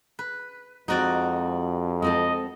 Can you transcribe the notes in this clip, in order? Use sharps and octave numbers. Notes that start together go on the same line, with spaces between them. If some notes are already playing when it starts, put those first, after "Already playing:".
B4
F2 G#3 C4 D#4 F#4 D5
G#3 C4 A4 D#5